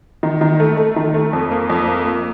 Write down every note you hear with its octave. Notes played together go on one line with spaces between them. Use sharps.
D#3
D#3
A3
A3
D#3
A3
F2
A#3
F2
A#3
A#3